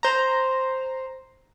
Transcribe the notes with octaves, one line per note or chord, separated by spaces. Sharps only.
C5 A#5